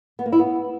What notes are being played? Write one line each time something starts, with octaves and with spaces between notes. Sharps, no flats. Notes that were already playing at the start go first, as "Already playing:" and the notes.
B3
A#3
E4
B3